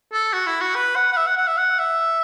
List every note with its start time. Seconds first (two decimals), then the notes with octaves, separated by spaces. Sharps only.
0.12 A4
0.33 F#4
0.46 E4
0.61 F#4
0.75 B4
0.96 F#5
1.12 F#5
1.16 E5
1.27 F#5
1.37 F#5
1.47 E5
1.58 F#5
1.79 E5